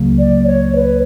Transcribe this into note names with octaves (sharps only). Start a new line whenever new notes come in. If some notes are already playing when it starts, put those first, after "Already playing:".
Already playing: C#2 C#3 F#3 A#3
D5
C#5
B4